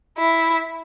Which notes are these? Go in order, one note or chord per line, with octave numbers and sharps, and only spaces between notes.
E4